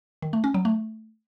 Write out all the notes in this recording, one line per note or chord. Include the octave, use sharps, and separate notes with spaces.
D#3
A3
C#4
F#3
A3